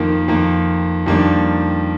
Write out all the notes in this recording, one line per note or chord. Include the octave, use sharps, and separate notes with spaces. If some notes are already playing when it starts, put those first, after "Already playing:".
Already playing: F2 D#3 A#3
F2 D#3 A#3
F2 D#3 G3 A#3 D4